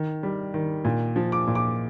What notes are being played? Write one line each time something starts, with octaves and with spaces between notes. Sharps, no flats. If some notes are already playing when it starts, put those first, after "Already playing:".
Already playing: D#3
G3
D#3
A#2
F3
D6
A#2
D6